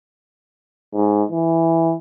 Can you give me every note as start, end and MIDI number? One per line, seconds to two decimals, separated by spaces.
0.94 1.24 44
1.31 1.94 52